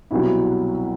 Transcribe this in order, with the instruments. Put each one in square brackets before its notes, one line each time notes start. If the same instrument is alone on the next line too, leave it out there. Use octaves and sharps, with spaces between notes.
[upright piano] C2 B2 F#3 E4